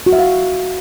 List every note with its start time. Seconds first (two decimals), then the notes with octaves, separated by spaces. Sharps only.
0.06 F#4
0.13 E5
0.19 F5